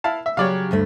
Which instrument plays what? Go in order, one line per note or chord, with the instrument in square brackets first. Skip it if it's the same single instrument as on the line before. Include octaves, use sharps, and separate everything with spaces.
[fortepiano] E4 F5 A5
E5
[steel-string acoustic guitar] C#3 F#3 G4 [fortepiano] C#5 D5 F5
[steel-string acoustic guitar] D2 G2 A3